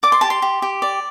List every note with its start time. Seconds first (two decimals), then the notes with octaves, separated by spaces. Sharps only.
0.03 D5 D6
0.12 C6
0.21 G4 A5
0.30 C6
0.42 G4
0.62 G4
0.82 D5